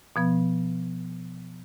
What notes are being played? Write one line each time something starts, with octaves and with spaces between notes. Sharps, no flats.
B2 F3 B3